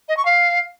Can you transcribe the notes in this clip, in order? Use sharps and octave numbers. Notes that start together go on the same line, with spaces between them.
D#5
C#6
F5